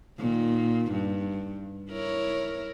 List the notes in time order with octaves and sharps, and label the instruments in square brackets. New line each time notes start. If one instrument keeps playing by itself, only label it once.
[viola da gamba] A#2 D#3
G2
E4 A#4 C#5